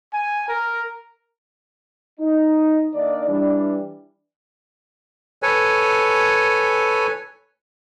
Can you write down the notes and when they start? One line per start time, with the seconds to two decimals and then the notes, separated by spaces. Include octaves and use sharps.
0.13 G#5
0.48 A#4
2.20 D#4
2.94 D#3 A#3 D4 D#4 A#4 D5
3.28 E3 G3 D4
5.43 A4 B4 C#5 G#5